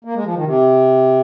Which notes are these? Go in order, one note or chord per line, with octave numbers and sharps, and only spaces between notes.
A#3
G#3
F3
D#3
C3